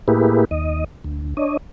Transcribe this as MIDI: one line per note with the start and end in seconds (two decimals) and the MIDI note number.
0.08 0.45 45
0.08 0.45 58
0.08 0.45 64
0.08 0.45 67
0.08 0.45 68
0.08 0.45 71
0.51 0.84 39
0.51 0.84 75
1.04 1.34 38
1.37 1.57 62
1.37 1.57 73
1.37 1.57 75